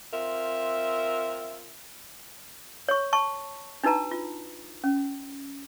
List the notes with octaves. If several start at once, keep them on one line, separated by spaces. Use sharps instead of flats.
C4 F4 A#4 E5
C#5 C#6
A5 C#6
D4 D#4 F#4 B4 A5 A#5
F4
C#4